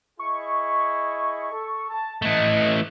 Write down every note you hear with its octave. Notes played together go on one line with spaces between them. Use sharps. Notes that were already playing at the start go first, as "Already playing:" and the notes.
E4 G#4 D#5 C#6
A4
A5
E3 A3 D#5